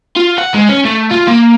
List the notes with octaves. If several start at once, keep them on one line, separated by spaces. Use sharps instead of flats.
F4
F#5
G#3
C#4
A3
F4
A#3